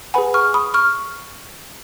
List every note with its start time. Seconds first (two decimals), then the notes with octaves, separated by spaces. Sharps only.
0.14 G#4 B4 F#5 G#5 B5
0.34 C#6 F6
0.54 B5 D#6
0.74 C#6 F6